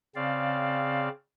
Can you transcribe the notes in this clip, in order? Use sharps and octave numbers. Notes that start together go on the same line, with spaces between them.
C#3 C4 D5 F5